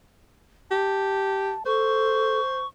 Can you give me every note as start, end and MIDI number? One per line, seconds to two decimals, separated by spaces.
0.71 1.53 67
0.71 1.63 81
1.66 2.40 69
1.66 2.62 72
1.66 2.67 85